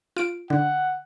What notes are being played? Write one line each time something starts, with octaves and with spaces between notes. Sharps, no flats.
F4 D7
D3 F#5